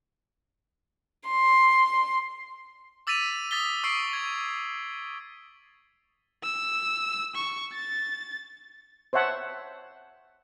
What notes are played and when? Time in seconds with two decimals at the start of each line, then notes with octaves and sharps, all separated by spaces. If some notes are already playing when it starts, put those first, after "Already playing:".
1.29 C6
3.07 D6 E6 A6 B6 D#7 F7
3.51 D#6 A6 B6 G7
3.84 C#6 D#6 E6 C7 D7
4.13 G#6
6.43 E6
7.36 C#6
7.73 A6
9.13 C5 C#5 E5 F#5 A5